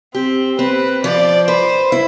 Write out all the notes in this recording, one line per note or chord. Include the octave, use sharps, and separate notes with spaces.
C4 G4
C4 B4
F3 D5
B4 C5
E4